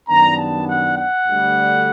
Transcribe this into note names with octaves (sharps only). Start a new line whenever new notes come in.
F#2 D#3 G3 B3 D4 A#5
A5
F#5
F#5
D2 D3 G3